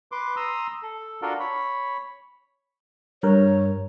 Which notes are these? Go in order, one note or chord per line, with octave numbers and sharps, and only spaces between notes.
B4 C6 D6
A#5 C6 D#6 E6
A4
D4 F4 F#4 A4 A#4
C#5 B5
G2 A#4 C#5